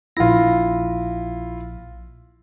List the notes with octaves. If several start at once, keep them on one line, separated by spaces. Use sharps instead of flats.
A#1 E4 F4 A#6